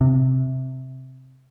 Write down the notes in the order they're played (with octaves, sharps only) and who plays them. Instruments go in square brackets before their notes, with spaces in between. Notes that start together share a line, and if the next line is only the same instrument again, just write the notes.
[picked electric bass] C3